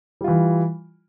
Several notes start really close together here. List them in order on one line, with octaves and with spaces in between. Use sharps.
G3 F4 E3